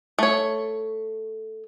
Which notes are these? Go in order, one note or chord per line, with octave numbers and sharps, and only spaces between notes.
A3 C#5